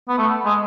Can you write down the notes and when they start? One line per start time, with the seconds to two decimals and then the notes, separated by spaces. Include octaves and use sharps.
0.09 B3
0.18 A3
0.45 G#3